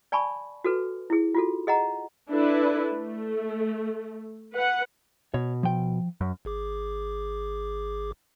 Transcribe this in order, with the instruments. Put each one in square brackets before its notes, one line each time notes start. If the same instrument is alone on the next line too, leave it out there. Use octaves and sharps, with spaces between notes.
[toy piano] D5 G#5 A5 B5 C#6
F#4 A4 B4
E4 G#4
F4 F#4 A4
G#4 D#5 F#5 A#5
[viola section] D4 E4 A4 B4
A3
B4 F#5
[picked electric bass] B2 [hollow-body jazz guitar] C#5
[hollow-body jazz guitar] F3 G5
[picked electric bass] F#2
[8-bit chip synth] G#1 G#4 D6